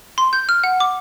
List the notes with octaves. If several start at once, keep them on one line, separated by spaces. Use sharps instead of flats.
C6
G6
F6
F#5
D6